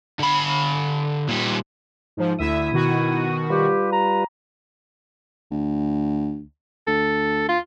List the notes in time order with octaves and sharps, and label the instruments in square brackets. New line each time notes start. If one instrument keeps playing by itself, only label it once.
[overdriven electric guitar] D3 B5
A#2 G3
[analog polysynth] G#2 F3
[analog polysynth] D2 E5 [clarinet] E4 [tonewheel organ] D#6
[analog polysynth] B2 D#3 F#4
[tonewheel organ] G3 F4 B4 [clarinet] G4
[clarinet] A#5
[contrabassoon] D2
[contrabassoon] D2 [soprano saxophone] A4
[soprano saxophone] F4